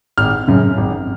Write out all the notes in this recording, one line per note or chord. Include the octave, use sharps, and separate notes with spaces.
G#1 F6
F#2 C#3
G#1